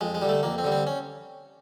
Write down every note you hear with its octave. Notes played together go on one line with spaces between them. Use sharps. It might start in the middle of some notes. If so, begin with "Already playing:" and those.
F2 G#3
G#3
D3 G3
A3
F2 A#3
C4
D3 G3
C4
C#4